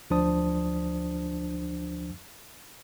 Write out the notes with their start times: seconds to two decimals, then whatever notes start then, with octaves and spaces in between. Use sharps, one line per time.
0.10 D2 F3 D4 C5 A5 D#6